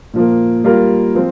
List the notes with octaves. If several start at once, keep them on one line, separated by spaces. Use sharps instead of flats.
A#2 F3 A#3
G3 A#3 F4 A#4
F3 C4